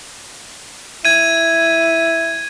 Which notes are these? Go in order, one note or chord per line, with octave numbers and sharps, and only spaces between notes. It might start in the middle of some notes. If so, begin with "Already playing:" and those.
E4 G#6 D#7